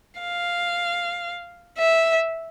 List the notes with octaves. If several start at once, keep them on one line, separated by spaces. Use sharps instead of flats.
F5
E5